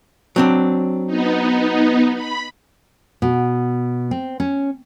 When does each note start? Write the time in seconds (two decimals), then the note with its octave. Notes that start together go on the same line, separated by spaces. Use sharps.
0.36 F#3 C4 D4
1.07 B3 D#4
2.15 B5
3.22 B2
4.11 C4
4.40 C#4